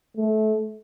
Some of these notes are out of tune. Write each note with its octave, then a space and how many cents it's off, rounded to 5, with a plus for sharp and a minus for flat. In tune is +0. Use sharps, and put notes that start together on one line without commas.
A3 -25